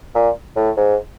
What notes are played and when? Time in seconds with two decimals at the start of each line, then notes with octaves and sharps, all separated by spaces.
0.15 A#2
0.56 A2
0.77 G#2